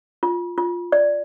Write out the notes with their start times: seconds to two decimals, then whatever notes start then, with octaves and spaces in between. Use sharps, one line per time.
0.23 F4
0.58 F4
0.92 D5